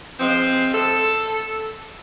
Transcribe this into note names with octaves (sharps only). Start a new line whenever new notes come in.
F3 G#3 C4
A4